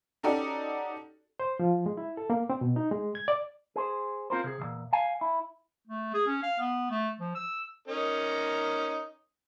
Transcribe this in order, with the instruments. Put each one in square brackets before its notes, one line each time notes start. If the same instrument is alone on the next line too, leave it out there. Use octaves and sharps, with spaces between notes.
[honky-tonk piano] C#4 D#4 F#4 G4 A4 D5
[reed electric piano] C5
F3
G#3
E4
A4
A#3
C4
B2
D#4
G#3
G#6
D5
[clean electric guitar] G#4 C5
C4 F4 A#4 C5
C3 G#4
B1 E2 A#2
F5 G#5
E4
[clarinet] A3
G#4
C#4
F5
B3
A3
F3
E6
[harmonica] C#4 D#4 A#4